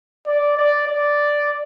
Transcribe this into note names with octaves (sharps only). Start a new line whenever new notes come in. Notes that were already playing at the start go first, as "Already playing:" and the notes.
D5
D5
D5